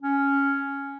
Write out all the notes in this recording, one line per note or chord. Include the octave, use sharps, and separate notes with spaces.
C#4